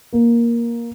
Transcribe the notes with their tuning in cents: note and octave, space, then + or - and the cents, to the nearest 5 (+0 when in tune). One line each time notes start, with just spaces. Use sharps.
A#3 +10